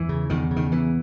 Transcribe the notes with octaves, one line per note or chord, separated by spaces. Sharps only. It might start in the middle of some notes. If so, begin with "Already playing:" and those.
Already playing: E2 E3
C#3
E2 D#3
C#3
D#3
E2 E3